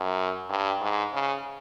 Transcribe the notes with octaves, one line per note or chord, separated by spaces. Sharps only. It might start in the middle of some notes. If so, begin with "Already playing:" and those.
Already playing: F#2
G2
G#2
C#3